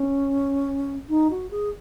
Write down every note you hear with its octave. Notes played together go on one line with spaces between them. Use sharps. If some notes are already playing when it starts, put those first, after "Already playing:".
Already playing: C#4
D#4
F#4
G#4